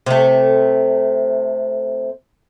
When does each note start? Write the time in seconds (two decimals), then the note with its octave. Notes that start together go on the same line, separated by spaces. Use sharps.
0.06 C3 A3